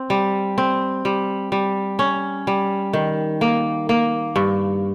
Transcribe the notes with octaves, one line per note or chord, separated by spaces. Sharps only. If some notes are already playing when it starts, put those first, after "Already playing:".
Already playing: C4
G3
C4
G3
G3
C#4
G3
D#3
A#3
A#3
G2